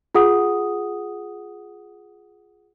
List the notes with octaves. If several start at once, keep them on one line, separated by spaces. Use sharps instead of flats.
F4 G#4 F#5 D#6